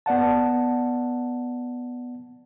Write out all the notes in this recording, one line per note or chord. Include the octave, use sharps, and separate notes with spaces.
B3 D5 F#5 A5